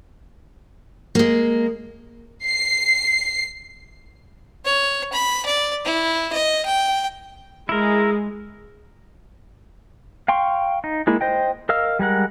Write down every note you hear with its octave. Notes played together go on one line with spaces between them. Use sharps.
G#3 A#3
C7
C#5
B5
D5
E4
D#5
G5
G#3 E4 A#4
F5 G5 C6 C#6
D#4
G#3 A#3 E4 G#4
C5 D#5 G5
A#4 D#5 F5 E6 F6
G3 G#3 A#4 F#5